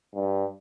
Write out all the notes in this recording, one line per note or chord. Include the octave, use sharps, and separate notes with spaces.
G2